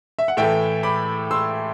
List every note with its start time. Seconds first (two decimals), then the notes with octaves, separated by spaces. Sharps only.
0.19 E5
0.28 F#5
0.37 A2 E3 A3 E5 G5
0.83 B5 D6
1.31 C6 E6